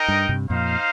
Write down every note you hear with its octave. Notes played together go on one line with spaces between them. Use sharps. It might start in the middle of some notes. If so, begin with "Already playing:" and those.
Already playing: D#4 A#4 D#5 G5
G2
G2 C3
F2 A#2 D#4 C5 F5